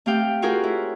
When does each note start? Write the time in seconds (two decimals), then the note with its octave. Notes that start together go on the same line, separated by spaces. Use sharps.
0.06 A3 C4 G4 F5 G5
0.42 C#4 F4 F#4 G#4 A#4 C5
0.64 E4